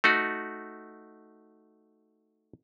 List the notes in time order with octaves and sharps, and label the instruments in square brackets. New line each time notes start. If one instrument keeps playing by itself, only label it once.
[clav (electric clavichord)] A3 D#4 F#4